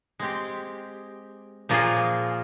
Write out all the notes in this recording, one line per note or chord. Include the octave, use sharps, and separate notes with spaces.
G#3 C4 G4
A#2 F3 A#3 F4 G#4